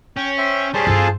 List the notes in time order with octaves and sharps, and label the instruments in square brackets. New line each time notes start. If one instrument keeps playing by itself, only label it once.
[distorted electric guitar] C#4 [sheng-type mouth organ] G5
[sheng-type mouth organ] C5 E5 G5
[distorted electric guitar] G3 C#4 [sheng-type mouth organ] G#4 C5 A5
[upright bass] G2 E4 [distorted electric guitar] F4 A4